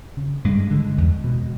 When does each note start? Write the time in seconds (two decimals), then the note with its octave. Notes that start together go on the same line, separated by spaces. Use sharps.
0.17 C#3
0.45 G2 G#3
0.70 D3
0.98 E2
1.24 B2